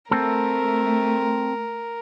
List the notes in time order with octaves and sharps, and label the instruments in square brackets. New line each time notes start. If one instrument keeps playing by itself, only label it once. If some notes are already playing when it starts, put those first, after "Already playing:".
[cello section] A3 [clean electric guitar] C4 A4 [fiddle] A#4